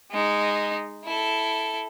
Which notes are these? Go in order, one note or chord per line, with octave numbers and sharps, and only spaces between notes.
G#3 D#4
E4 A4